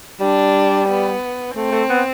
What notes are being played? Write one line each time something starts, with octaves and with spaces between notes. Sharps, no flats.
G3 D4
B3
A3 C4
A3
B3